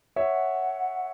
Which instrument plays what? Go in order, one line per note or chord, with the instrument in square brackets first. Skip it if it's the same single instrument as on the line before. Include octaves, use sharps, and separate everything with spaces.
[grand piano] C#5 E5 [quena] F#5